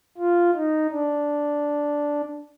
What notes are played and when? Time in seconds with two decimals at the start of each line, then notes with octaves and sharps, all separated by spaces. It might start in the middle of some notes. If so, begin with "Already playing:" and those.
0.18 F4
0.54 D#4
0.91 D4